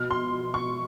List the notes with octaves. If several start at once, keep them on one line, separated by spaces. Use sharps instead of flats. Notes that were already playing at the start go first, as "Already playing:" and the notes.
Already playing: B2 F6
C6
C#6